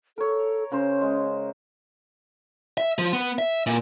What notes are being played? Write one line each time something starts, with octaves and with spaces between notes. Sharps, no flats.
A4 A#4 C#5
C#3 C#4 A#4 C5
G#3
E5
F3
B3
E5
A#2